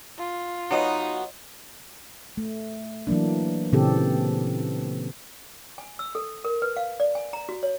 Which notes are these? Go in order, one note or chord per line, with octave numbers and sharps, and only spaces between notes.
F4
F#3 B3 D#4 F#4 C#5 D#5
A3
E3 F#3 A#3 D4
A#2 C#3 E3 C4 G4 A4
G#5
E6
A4
A#4
B4
F5
D5
G#5
A#5
F#4
C#5